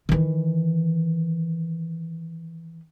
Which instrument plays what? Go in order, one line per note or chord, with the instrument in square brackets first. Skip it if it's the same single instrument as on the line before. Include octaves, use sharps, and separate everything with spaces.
[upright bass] D#3 E3